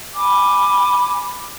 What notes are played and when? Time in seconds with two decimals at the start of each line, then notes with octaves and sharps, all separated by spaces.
0.15 G#5 B5 D6